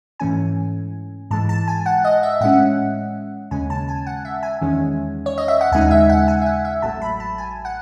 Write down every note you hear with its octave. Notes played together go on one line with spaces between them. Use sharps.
G#2 E3 A3 C#4 G#5
G#2 E3 G#3 A5
A5
G#5
F#5
D#5
E5
A2 G#3 C#4 F#5
D#2 C#3 G#3 C#4 G#5
A5
G#5
F#5
E5
G#5
E2 D#3 G#3 C#4
C#5
D#5
E5
F#5
D#2 C#3 G#3 D#4 G#5
E5
F#5
G#5
E5
F#5
E5
A1 A2 F#3 A3 A5
B5
A5
G#5
F#5